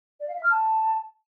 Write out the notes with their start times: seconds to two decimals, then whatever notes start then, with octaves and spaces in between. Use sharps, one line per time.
0.20 D5
0.27 F5
0.35 E5
0.43 F6
0.50 A5